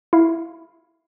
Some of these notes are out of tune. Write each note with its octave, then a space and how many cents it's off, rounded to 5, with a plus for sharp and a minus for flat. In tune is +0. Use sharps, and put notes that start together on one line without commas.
E4 +5 F5 +0